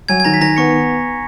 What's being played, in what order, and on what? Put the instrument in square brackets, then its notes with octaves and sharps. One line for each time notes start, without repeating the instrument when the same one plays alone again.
[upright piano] F#3 [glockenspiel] G#5 G#6
[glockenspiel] G#6
[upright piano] D#3 [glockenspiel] A#5 A#6
[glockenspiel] B6
[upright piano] D#3 [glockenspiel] A#5 A#6
[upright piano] B3 [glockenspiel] C#6 C#7